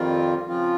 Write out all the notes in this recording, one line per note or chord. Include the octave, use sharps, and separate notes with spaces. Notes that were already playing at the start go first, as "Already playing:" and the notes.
Already playing: F2 D#3 G3 C4 F4
C#3 F3 C4 F4